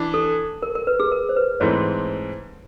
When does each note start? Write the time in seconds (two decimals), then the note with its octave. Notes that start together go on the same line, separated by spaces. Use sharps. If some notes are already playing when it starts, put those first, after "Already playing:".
Already playing: E3 D4
0.14 A4
0.62 A#4
0.75 A#4
0.87 B4
1.00 G#4
1.12 A#4
1.29 C5
1.36 B4
1.60 G#2 E3 A3 C4 C#5